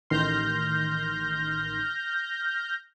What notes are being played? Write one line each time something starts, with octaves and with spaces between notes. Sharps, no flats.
A1 D#3 C6 F6 G6 A#6